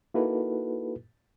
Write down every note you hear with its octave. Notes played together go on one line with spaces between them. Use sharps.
A#3 D#4 E4 F#4 A4 B4